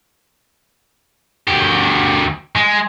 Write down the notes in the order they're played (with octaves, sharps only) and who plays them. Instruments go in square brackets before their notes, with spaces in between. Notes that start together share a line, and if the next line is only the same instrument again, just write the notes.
[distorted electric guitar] D2 G4
G#3